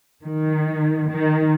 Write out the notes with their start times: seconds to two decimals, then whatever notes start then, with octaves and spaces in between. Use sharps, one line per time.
0.22 D#3
1.08 D#3